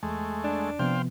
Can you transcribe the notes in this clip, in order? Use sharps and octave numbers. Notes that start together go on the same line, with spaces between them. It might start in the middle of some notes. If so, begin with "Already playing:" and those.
E2 G#3 A3
D4
C3 F3 B3 C5 F5 G5